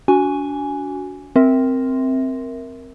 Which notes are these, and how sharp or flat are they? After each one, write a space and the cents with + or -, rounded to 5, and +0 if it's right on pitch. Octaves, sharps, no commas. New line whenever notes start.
D4 -35 F#4 +0 G#5 +0
C4 +0 A#4 +0 E5 -10